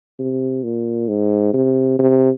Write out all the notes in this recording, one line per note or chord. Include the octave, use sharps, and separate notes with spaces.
C3
A#2
G#2
C3
C3